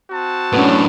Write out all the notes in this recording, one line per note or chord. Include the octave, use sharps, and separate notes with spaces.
C4 F#4 A5
F#2 A2 B3 C#4 D4